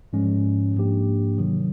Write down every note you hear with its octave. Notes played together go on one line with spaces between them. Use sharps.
G#2 F3 G#3 C#4
G#2 F3 A#3 D4 G4
C3 D#3 F#3